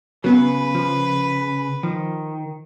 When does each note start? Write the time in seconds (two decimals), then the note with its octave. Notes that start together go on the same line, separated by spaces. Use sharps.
0.24 C#3 F#3 B3 B4
0.75 F3
1.83 D#3 F3